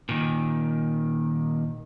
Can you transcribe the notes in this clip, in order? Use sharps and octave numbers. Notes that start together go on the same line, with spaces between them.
A#2 D#3